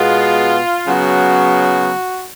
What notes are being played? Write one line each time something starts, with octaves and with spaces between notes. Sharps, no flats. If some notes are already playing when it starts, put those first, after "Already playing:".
Already playing: B2 G#3 B3 F4
C#3 F#3 B3 F#4